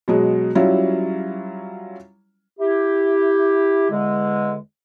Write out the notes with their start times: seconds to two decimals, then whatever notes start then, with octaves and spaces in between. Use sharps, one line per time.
0.08 B2 F#3 G#3
0.55 F#3 G3 C#4 E4 F4
2.59 E4 G4
3.90 E2 D3 G#3